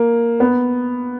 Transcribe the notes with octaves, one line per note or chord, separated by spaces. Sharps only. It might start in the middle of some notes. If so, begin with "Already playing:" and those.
Already playing: A#3
B3